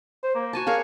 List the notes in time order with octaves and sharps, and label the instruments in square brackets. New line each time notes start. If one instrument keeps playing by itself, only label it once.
[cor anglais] C5
A#3
[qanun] F#4 G#5 A5
[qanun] G#4 A#4 C#5 [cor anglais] F5